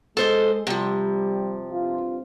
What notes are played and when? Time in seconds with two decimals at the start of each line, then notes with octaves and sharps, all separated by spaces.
0.17 G#3 A4 C5 D#5
0.67 C3 F3 G3
1.72 G2 C4 F4